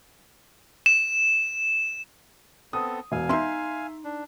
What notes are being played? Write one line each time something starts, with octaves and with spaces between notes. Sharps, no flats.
E7
B3 C4 A4 D#6
E1 F5 G#5
C#4 D#4 E5 C6
D4